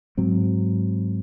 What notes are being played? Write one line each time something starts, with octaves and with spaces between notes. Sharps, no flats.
G#2 F#3 C4